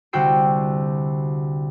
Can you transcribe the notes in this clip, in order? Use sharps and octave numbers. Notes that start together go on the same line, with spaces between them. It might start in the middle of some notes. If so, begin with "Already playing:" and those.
C2 D3 F#4 G5 E6 C7